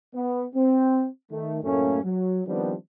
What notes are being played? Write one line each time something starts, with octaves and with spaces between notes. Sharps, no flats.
B3
C4
D#3 A3
F#2 A2 A3 A#3 C#4
F#3
D#3 F3 G3 B3 C4 D4